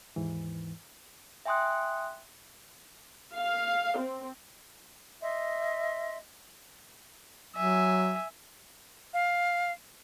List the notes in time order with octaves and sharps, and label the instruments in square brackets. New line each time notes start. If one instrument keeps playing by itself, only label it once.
[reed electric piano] D#2 G#2 E3
[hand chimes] E5 G5 G#5 C6 D#6 F#6
[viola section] F5
C4
[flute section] D#5 E5 C6
[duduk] F#3 [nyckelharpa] E5 G#5
[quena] F5